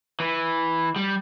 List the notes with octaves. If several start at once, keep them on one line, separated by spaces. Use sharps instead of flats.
E3
G3